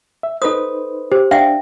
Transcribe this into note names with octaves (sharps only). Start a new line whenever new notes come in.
E5
D#4 A4 B4 C5 D#6
G4 C5
D4 E5 F5 G5